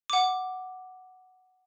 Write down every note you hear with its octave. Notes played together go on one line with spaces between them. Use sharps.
F#5 D6